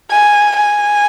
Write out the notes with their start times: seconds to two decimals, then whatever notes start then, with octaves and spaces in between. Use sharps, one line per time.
0.11 G#5
0.56 G#5